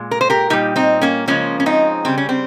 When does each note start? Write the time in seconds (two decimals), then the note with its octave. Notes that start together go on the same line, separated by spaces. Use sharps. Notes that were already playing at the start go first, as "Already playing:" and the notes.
Already playing: A#2 G#3
0.11 A#4
0.21 C5
0.30 G4 A#4
0.50 A#2 G3 D#4 G4
0.76 C4 D#4
1.02 A#3 C#4
1.28 C#3 F3 G#3 A#3 C#4
1.60 C#4
1.66 C4 D#4
2.05 C#3 G3 C4
2.18 C#4
2.29 C4